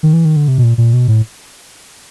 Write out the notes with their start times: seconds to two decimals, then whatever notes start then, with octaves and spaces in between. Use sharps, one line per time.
0.03 D#3
0.13 E3
0.25 D#3
0.36 D3
0.48 C3
0.58 B2
0.63 A#2
0.78 A#2
0.93 B2
1.08 A2